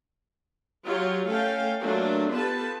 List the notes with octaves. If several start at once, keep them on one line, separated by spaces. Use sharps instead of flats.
F#3 F4 G4 C#5
A3 C#4 A4 F5 G5
F#3 A3 A#3 D4 F4
B3 F4 G4 A4 B4 A5